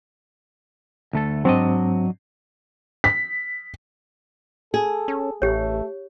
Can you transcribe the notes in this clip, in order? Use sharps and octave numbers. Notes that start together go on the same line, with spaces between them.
D2 A3 A4
G#2 F#3 C4 D4 D#5
B6
G#4 A4
C#4
A1 A3 G4 C#5